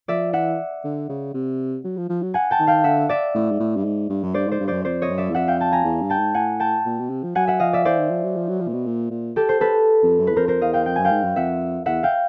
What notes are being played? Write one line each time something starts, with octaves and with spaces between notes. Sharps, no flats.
F3 D5 E5
E3 E5 F#5
D3
C#3
C3
F#3
F3
F3
F#3
F#5 G#5
G5 A5
D#3
F5 G5
D3 E5 F#5
D5 E5
A2
G#2
A2
G2
G#2
G2
F#2
G2 C5 D5
G#2 C5 D5
G2
F#2 C5 D5
F2 C5 D5
C#5 D#5
F#2
D5 E5
E2
F2 E5 F#5
F5 G5
G5 A5
G#5 A#5
E2
G2
G5 A5
G#2
A2 F#5 G#5
G5 A5
A#2
B2
C3
F3
F#3 F#5 G#5
E5 F#5
F3 D#5 F5
D5 E5
E3 C5 D5
D#3
F3
F#3
F3
F#3
F3
A#2
B2
A#2
A#2
G4 A4
C5
A4 B4
F2
F#2
E2 B4
F2 A#4 C5
A#4 C5
E2 D#5 F5
F5 G5
F2 G5
F#2 G#5
F5 G5
G#2
F#2
F2 E5 F#5
E2 E5 F#5
F5 G5